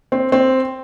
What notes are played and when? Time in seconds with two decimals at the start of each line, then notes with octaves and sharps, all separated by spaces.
0.12 C4
0.32 C4